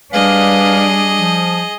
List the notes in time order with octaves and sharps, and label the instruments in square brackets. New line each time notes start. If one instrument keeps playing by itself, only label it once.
[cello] G3 D4 [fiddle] G#4 D#5 [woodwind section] B4 F5
[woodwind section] F3